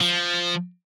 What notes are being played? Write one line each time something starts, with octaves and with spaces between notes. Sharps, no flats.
F3